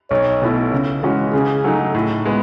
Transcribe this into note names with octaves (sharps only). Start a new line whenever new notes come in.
B1 C#5
B2 A3 E4
C#3
E3 G#3 C#4 F#4
C#3 G#4
F#3 A3 D#4
A2
G#3 B3